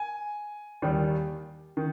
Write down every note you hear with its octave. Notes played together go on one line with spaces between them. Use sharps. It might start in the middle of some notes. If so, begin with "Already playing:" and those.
Already playing: G#5
D#2 D#3 G3
D#3